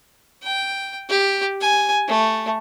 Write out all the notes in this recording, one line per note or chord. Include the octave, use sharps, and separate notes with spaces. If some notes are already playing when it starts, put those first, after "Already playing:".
G5
G4
G#5
A3